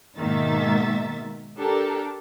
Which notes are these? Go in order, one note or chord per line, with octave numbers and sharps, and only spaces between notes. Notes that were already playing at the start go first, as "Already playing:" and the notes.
G#2 B2 D#3 A#3 E5 A6
D4 G4 A4 A#4